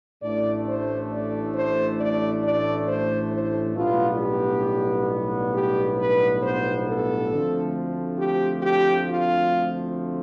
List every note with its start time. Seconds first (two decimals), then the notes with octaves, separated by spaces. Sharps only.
0.22 A1 A2 E3 A3 D4 D5
0.67 C5
1.11 D5
1.55 C5
1.99 D5
2.44 D5
2.88 C5
3.32 C5
3.75 B1 A2 G3 B3 D4 F4
4.20 G4
5.53 G4
5.97 B4
6.42 C5
6.86 A4
7.30 D2 D3 F3 A3 C4
8.19 G4
8.63 G4
9.08 F4